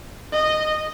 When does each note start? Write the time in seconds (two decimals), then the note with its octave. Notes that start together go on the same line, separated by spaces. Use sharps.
0.33 D#5